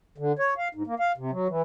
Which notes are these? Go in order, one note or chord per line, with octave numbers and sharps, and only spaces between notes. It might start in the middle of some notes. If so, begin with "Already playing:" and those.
D3
C#5
F5
G#2
A#3
F5
C3
F#3
E3